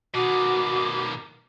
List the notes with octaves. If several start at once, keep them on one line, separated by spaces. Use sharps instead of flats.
B2 D#3 F#4 D6